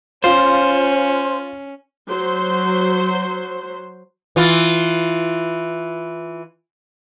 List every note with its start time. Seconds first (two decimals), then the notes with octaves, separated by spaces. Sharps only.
0.24 C#4 F4 C5
2.09 F#3 C5
4.36 E3 F4